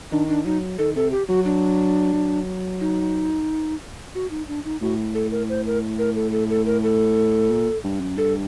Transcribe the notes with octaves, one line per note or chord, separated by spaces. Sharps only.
D#3 D4
D4
F#3 D#4
D#3 A4
C3 A4
G4
F#3 F#4
D4
F#3
D#4
F#4
D#4
D4
D#4
A2 F#4
A4
A#4
C5
A#4
A#4
A4
A4
A4
A#4
A4
A#2
G2
F#2
G2 A4